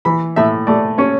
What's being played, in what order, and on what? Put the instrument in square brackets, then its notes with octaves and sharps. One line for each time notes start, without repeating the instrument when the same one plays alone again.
[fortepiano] E3 [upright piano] B5
[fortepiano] A2 [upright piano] E5
[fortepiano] A3 [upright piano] D5
[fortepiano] C#4 [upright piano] C#5